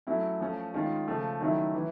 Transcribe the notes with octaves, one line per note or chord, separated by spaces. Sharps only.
F#3 A3 C#4 E4
F3 A3 C#4
D#3 G#3 C#4 F4
C#3 F3 A3 C#4
D#3 F#3 A3 C#4 E4
E3